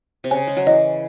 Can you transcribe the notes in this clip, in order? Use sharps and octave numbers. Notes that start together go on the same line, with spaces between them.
C3
C#3 G#5
G#3
F#3
E3 D#5